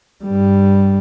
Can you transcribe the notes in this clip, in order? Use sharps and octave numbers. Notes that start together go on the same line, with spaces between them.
G2 G3